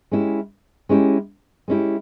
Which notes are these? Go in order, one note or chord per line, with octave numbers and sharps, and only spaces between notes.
G#3 C#4 E4 G4
G#3 C#4 E4 G4
G#3 C#4 E4 G4